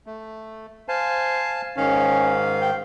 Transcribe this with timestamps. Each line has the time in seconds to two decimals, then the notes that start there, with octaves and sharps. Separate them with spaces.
0.06 A3
0.88 C5 F5 G#5 A5
1.77 G#2 D#3 C#4 F5
2.61 G5